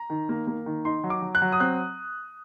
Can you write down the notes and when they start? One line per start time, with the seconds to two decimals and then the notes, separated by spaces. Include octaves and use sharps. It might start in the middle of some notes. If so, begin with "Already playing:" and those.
Already playing: A#5
0.10 D#3
0.29 A#3
0.47 A#3
0.66 D#3
0.85 D#4 C6
1.04 F#3
1.10 D6
1.22 F#3
1.35 F#6
1.42 F#3
1.52 D#6
1.60 C4 F#6